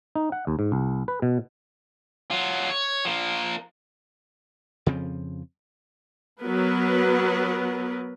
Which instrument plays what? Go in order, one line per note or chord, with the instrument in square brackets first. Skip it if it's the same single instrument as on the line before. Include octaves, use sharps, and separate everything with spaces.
[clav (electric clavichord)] D#4
F#5
D#2
G#2
C2
B4
B2
[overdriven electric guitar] F#3 F4
C#5
F3 A#3
[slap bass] F2 C#3 F3 C4
[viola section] F#3 B3 A#4 B4